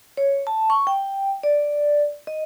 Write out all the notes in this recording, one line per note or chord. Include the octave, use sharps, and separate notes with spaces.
C#5
A5
C#6
G5
D5
D#5